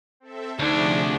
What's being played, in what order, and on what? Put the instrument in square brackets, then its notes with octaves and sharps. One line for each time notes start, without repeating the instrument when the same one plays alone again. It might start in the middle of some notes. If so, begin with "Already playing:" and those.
[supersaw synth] C4 A4 E5
[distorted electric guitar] D2 [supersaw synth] C3 F3 G#4 [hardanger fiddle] D4 [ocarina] D#4